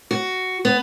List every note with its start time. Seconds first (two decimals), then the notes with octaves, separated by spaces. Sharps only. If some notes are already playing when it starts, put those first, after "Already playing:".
0.11 F#4
0.65 B3